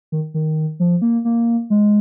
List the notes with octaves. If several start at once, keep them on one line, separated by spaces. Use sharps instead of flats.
D#3
D#3
F3
A#3
A#3
G#3